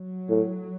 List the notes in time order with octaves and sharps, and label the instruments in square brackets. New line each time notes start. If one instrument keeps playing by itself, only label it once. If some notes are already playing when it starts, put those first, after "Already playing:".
Already playing: [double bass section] F#3
[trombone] A2